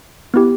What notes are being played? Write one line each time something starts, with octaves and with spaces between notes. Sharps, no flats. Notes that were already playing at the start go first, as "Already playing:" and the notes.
B3 E4 G4